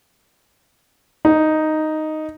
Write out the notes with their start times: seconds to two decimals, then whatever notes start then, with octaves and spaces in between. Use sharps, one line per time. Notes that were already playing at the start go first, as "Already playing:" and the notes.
1.25 D#4